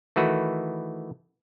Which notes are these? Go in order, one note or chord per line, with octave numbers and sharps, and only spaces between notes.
D#3 E3 A3 F#4 B4